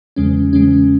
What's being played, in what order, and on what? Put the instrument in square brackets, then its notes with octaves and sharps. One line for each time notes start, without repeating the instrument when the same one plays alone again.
[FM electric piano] E2 C#3 G#3 C#4
E2 C#3 G#3 C#4